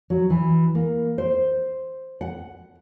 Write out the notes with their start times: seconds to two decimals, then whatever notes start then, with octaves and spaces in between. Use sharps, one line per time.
0.10 F#3
0.30 E3
0.75 A#3
1.18 C5
2.21 F#5